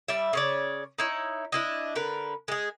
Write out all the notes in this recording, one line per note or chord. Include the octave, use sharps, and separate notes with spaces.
G3 D5 E5
C#3 C#5 D5
D#4 E4 C#5
D4 E4 D#5
D3 A#4 B4
G#3 G#4